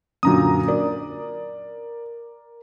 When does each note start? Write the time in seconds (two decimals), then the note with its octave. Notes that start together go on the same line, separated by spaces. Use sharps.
0.23 F#2 A#2 D3 F#3 A#5 D#6
0.68 A#4 D5